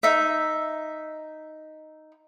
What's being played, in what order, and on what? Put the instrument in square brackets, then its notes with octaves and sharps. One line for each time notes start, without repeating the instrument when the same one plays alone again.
[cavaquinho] D#4 E5